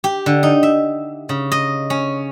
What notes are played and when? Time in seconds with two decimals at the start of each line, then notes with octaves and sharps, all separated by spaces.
0.04 G4
0.26 D3
0.43 D#4
0.63 E5
1.29 C#3
1.52 D#5
1.90 C#4